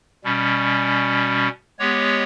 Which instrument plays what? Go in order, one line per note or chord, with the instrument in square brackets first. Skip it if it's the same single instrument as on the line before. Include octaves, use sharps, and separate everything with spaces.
[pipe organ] B2 G3 C#4
G#3 B3 G4 C#5